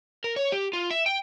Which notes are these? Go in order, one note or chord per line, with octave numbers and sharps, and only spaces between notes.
A#4
C#5
G4
F4
E5
G5